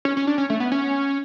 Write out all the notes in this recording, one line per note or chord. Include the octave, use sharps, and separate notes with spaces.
C#4
C#4
D4
C#4
A3
B3
C#4